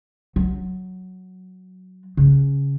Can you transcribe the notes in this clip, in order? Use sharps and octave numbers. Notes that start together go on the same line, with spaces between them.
F#3
C#3